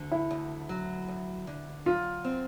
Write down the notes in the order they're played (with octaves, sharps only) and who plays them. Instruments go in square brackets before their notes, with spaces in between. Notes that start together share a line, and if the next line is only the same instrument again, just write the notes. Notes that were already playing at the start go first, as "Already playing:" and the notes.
Already playing: [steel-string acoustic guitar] D2 D3
[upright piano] E4
[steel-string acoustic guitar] D2
F#3
D2
D3
[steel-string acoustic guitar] F#3 [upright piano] F4
[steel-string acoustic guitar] C4